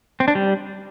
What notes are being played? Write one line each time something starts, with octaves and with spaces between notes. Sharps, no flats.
C4
D4
G3